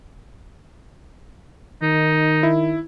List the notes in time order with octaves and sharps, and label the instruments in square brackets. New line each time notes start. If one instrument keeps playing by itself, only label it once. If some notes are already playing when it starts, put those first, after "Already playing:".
[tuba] D#3 [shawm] D#4
[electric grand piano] E4